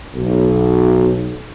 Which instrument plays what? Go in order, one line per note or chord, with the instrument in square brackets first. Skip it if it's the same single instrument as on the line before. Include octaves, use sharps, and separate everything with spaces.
[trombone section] B1